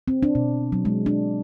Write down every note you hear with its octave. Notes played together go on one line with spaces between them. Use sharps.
C4
D4
B2
F#3
G#3
D4